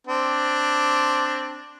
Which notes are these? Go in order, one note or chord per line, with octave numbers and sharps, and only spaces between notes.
C4 D4